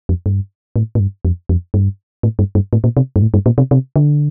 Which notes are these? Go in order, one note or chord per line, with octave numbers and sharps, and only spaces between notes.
F2
G2
A2
A2
G2
F2
F2
G2
A2
G2
G2
A2
A#2
C3
G2
A2
G2
A#2
C3
C3
D3